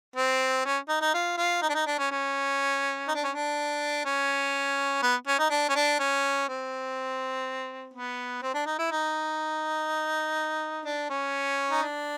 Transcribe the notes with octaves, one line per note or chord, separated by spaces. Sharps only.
C4
C#4
D#4
D#4
F4
F4
D#4
D4
D#4
D4
C#4
C#4
D#4
D4
C#4
D4
C#4
B3
C#4
D#4
D4
C#4
D4
C#4
C4
B3
C4
D4
D#4
E4
D#4
D4
C#4
D#4
D4